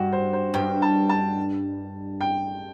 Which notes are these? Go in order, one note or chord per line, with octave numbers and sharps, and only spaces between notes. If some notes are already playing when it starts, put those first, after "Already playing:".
Already playing: G2 F#4
C5
C5
G2 G5
A5
A5
G5